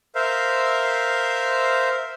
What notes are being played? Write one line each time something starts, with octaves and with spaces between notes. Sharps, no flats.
A#4 C5 E5 F5